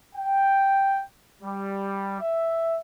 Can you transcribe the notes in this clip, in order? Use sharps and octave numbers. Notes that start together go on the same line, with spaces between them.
G5
G3
E5